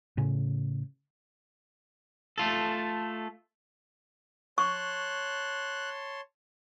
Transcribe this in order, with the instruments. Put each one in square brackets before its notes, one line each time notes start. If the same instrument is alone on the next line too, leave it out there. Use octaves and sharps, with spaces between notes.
[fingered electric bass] A2 C#3
[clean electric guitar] A3 F4 A4
[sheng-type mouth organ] C#5 A5 C6 [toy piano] C#6 [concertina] F#6